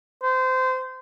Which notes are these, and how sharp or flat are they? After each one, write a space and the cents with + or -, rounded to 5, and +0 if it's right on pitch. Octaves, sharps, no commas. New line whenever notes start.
C5 -25